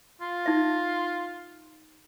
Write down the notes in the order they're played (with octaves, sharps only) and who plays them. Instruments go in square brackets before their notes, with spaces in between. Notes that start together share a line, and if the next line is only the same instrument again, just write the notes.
[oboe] F4
[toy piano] D#4 E5